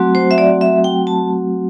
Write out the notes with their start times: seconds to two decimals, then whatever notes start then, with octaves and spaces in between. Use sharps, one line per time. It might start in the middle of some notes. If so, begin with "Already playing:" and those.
Already playing: F#3 A3 C4 F#4
0.15 C5
0.31 E5
0.38 D5
0.61 E5
0.84 G5
1.07 A5